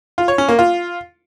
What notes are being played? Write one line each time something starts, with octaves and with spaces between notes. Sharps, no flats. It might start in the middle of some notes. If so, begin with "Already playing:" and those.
F4
C#5
C#4
A#3
F4